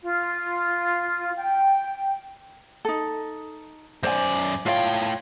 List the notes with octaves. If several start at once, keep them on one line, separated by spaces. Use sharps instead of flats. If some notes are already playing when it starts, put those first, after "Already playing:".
F4
G5
D#4 A4
F#2 C5 D5 G#5
A2 F4 C#5 F5 G5